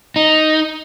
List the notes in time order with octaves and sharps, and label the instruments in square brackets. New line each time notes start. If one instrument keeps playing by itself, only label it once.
[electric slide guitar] D#4